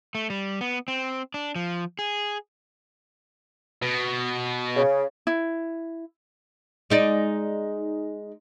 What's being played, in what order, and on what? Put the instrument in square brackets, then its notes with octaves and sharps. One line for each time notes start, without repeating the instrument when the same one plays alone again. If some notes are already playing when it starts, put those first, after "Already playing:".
[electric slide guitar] A3
G3
B3
C4
D4
F3
G#4
[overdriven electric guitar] B2
[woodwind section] C#3
[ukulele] E4
[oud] G#3 D#4 D5